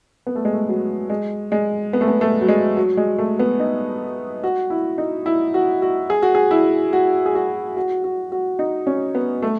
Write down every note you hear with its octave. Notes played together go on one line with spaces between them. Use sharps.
B3
A3
G#3
A3
F#3
G#3
G#3
B3
A3
B3
A3
F#3
G#3
F#3
G#3
A3
B3
D#4
F#4
E4
D#4
E4
F#4
F#4
G#4
F#4
G#4
E4
F#4
G#4
F#4
F#4
F#4
F#4
D#4
C#4
B3
A3